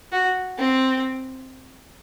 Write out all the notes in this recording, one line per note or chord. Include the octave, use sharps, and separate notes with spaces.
F#4
C4